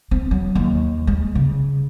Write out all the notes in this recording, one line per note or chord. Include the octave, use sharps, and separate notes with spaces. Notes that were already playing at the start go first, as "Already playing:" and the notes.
C4
F#3
D#2
G#3
C#3